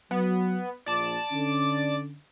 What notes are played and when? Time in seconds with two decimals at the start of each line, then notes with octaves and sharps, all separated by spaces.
0.11 F#3 B3
0.86 A#1 D5 A5 D6
1.31 D3 C#4